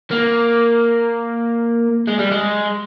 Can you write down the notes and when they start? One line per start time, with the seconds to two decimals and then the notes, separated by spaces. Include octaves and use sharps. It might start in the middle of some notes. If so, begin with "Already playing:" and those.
0.11 A#3
2.08 G#3
2.19 G3
2.31 G#3